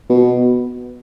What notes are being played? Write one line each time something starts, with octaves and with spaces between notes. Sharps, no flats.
B2